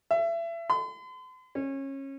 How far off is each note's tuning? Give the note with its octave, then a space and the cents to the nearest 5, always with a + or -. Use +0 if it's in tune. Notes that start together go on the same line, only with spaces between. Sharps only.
E5 +30
C6 -45
C#4 -25